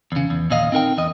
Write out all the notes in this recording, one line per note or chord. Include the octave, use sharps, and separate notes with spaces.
E2 C#3
E2
D#2 A#2 D#5 F5
C4 D#4 A#4 G5
E2 D#5